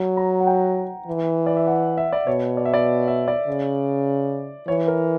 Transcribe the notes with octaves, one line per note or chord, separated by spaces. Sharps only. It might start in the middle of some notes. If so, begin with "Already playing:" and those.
Already playing: F#3
A#5
F#5
G5
E3
D5
E5
F#5
E5
D5
B2 C#5
D5
E5
D5
E5
D5
C#3
E3 C#5
A#4